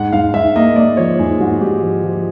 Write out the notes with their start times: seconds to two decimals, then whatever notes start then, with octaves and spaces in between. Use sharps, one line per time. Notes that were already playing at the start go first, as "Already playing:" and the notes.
Already playing: G#2 F#5
0.13 G#2 F5
0.34 G#2 E5
0.56 A#3 D#5
0.76 A#3 D5
0.97 F3 C#5
1.19 G#2 G#4
1.40 G#2 F#4
1.61 G#2 G4
1.82 F3
2.04 F3